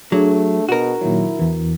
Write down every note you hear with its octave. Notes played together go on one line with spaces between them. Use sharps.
F#3 A3 D4 G#4
B2 F#4 A#4
A#2 D#3 F#3 E4
E2 E3